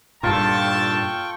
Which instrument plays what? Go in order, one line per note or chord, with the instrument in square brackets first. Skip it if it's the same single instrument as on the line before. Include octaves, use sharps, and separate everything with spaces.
[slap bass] G2 A#2 [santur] F4 A4 [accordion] G5 C#6 [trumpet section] A5